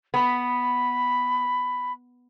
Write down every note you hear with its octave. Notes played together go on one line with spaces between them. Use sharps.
B3 B5